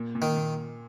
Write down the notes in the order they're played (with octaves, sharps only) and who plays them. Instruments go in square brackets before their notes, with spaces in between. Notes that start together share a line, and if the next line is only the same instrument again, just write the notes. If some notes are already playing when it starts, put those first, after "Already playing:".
Already playing: [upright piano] A#2
A#2
[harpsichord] D#3
[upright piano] A#2